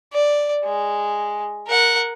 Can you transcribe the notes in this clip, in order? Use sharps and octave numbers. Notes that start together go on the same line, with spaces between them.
D5
G#3
A#4 F#5